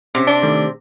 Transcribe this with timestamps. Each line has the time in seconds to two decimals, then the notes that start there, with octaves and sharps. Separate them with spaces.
0.15 C3 C4 C#4
0.27 D4 A5
0.43 D#3 A3